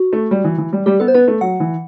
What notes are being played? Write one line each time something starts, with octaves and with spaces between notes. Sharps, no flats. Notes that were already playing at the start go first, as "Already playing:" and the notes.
Already playing: F#4
A3
G3
E3
E3
G3
G3 G4
B3 A4
C5
B3 B4
A3
F#3 F#5
E3